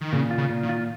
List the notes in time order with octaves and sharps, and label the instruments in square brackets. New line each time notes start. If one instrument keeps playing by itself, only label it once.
[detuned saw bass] D#3
[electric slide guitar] A#2 [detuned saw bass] C#3
[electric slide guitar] F4
[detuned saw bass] C#3
[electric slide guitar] A#2
[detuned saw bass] D#3
[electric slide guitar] F4